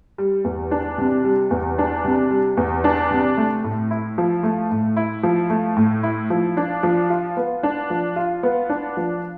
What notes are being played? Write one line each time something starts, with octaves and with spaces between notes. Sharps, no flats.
G3
E2
D4
C3
G3
E2
D4
C3
G3
E2
D4
C3
A3
A2
E4
F3
A3
A2
E4
F3
A3
A2
E4
F3
D4
F3
F4
B3
D4
F3
F4
B3
D4
F3